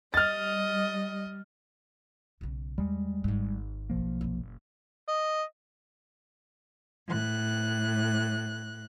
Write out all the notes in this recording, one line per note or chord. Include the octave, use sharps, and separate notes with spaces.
G3 D#5 F6 A6
B1 C#3
E2 G3 G#3
G#1 G#2
B1 F3 A#3
F#1 A#2
D#5
A2 F#6